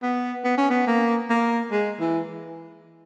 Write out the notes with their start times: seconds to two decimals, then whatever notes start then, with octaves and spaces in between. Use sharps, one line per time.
0.03 B3
0.44 B3
0.58 C#4
0.71 B3
0.87 A#3
1.30 A#3
1.71 G#3
2.00 E3